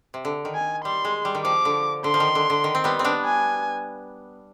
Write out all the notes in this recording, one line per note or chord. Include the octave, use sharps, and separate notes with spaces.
C3
D3
D#3
G#5
G3 C6
G#3
G3
D#3
F3 D6
D3
D3 C6
F3
D#3
D3
D3
D#3
C4
G3 B3
C4
B3 D4
G#5